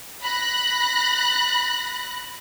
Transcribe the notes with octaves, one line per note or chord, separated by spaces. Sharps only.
B5 F#6 A#6